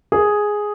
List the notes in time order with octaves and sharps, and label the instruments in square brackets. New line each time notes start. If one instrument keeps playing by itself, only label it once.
[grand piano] G#4